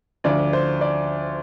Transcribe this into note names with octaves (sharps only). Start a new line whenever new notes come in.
D2 D3 F3 D5
C5
D5